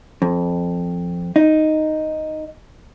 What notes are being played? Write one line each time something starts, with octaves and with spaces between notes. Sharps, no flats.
F2
D#4